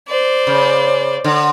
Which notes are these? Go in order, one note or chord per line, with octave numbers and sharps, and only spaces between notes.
C5 D5
C#3
D3